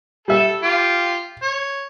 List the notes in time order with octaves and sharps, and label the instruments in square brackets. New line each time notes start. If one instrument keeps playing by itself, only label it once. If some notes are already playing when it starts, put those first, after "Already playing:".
[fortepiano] G3 E5 [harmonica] A4
[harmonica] F4 G4
C#5